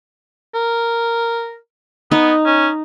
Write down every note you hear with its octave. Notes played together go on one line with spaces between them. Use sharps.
A#4
B3 D#4
C#4